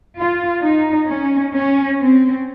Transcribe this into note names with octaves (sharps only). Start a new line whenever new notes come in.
F4
D#4
C#4
C#4
C4